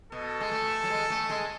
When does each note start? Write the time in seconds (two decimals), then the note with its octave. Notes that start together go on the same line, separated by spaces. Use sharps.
0.12 B2 A4
0.41 G#3
0.52 A3
0.84 F#3
0.90 G#3
1.10 A3
1.30 G#3